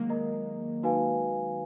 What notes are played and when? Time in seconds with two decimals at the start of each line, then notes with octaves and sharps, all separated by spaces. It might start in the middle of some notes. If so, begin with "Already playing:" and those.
Already playing: D#3 F#3 G#3 A#3
0.09 A#4 D#5 A#5
0.83 D#4 F#4 B4 F5 G#5